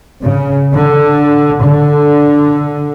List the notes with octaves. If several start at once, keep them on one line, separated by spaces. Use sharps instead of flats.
C#3
D3
D3